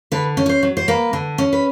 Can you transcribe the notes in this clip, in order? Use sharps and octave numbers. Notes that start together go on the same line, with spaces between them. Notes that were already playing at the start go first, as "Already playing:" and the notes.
D3 B4
C#4
C#5
C5
F#3
C5
A#3 B4
D3
C#4
B4